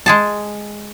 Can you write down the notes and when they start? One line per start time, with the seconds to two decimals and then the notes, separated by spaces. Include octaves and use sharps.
0.06 G#3 G#4 A5